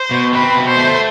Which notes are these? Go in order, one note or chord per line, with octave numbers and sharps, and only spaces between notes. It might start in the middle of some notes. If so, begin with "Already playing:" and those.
Already playing: C5
B2
C4 B4
B2
C5
A3